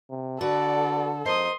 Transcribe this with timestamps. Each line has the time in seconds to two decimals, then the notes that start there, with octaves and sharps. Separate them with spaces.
0.10 C3
0.41 D3 F#4 A4 B4 D5
1.25 F2 A#4 C5 D#5 C6 D#6